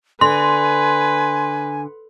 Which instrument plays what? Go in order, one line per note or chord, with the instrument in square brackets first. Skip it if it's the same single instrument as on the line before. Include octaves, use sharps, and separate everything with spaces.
[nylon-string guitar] D3 [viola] B4 [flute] G#5 [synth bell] C6